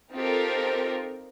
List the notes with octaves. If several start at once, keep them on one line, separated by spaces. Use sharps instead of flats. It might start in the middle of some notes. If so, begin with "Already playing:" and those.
C4 D#4 F4 G4 A4 A#4